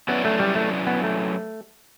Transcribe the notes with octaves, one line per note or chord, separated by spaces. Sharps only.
F#3 B3 C#4 E4 B4 D5
A3
G3
A3
B3
A3